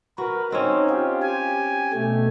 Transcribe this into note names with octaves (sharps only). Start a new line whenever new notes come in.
F#4 A#4 B4
C4 C#4 D#4
F4 G4
G4 G#5
B2 A3